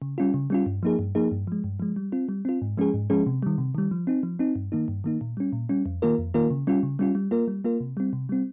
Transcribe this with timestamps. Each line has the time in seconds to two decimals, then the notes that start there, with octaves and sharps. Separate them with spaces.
0.02 C#3
0.18 G3 C#4 F4
0.34 C#3
0.50 G3 C#4 F4
0.66 G2
0.83 F3 A#3 D#4 G#4
0.99 G2
1.15 F3 A#3 D#4 G#4
1.31 G2
1.47 F3 G#3
1.64 G2
1.80 F3 G#3
1.96 G3
2.12 C4 F4
2.29 G3
2.45 C4 F4
2.62 G#2
2.77 F3 G#3 C#4 G#4
2.94 G#2
3.10 F3 G#3 C#4 G#4
3.26 C3
3.43 D#3 G3
3.58 C3
3.75 D#3 G3
3.91 F3
4.07 C4 D#4
4.23 F3
4.39 C4 D#4
4.55 G2
4.72 D#3 A#3 D#4
4.88 G2
5.04 D#3 A#3 D#4
5.21 A#2
5.37 G3 C#4
5.53 A#2
5.69 G3 C#4
5.86 F2
6.02 D#3 A#3 F4 A#4
6.18 F2
6.34 D#3 A#3 F4 A#4
6.50 C#3
6.67 G3 C#4 F4
6.83 C#3
6.99 G3 C#4 F4
7.15 G3
7.31 A#3 F4 A#4
7.48 G3
7.64 A#3 F4 A#4
7.80 C3
7.97 G3 C4
8.13 C3
8.29 G3 C4